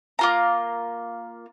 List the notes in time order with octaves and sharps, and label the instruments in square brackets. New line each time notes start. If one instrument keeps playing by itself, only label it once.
[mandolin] A#3 F4 A#5